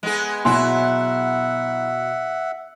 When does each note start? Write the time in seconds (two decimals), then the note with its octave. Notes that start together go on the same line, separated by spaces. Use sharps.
0.03 G#3 B3 G#4
0.45 B2 F#3 E4 E5 F#5 G#5 C6